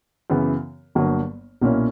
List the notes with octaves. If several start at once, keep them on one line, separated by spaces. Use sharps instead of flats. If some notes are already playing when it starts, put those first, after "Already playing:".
F#2 C#3 E3 B3
G1 G2 F#3 A#3
B1 A#2 A#3 C#4 E4